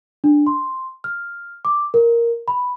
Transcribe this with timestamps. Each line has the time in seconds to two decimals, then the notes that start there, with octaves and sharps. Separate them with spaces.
0.24 D4
0.47 C6
1.04 F6
1.65 D6
1.94 A#4
2.48 B5